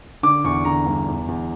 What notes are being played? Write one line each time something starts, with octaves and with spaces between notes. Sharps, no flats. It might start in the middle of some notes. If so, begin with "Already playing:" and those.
D3 D6
E2 C#6
D3 A#5
G2
E2
E2